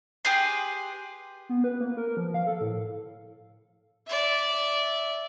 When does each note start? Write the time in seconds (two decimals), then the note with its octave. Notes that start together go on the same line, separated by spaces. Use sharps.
0.25 G4 G#4 B4 C6
1.49 B3
1.64 B4
1.81 A#3
1.97 A#4
2.17 F3
2.34 F5
2.47 A4
2.61 A2
4.07 D5 E5